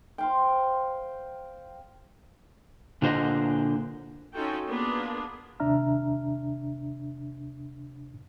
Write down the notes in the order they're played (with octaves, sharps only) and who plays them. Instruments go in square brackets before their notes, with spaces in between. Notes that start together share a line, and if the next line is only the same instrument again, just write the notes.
[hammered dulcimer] C5 F5 G5
[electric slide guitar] A#2 D3 F#4 C5 D#5 F#5
[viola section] C#4 D#4 F4 F#4 A4 G5
A#3 B3 D4 F4 G#4
[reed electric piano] D#2 C3 D4 E5 A#5 F6